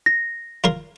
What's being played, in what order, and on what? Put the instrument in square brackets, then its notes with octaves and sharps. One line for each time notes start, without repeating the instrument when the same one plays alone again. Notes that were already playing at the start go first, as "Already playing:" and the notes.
[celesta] A#6
[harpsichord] F4 A#4 C6